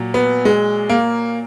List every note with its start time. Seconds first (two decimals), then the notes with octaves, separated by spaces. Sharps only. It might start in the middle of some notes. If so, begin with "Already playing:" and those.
Already playing: A#2 F#3
0.14 B3
0.45 G#3
0.89 A#3